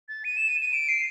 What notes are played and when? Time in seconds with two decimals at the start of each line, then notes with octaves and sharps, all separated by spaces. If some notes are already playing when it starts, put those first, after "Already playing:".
0.09 A6
0.24 D#7
0.37 E7
0.48 D#7
0.61 D#7
0.73 D7
0.89 C7